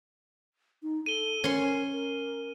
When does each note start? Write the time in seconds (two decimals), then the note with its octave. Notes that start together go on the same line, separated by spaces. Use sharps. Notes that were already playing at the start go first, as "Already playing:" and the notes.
0.83 D#4
1.06 A4 D#7 G7
1.44 C#4 A#4 C6
1.92 A#4